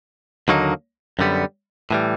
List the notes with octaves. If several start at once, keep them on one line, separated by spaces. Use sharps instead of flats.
D#2 D3 F#3 A#3 D#4
F#2 D3 G3 B3
A2 E3 G3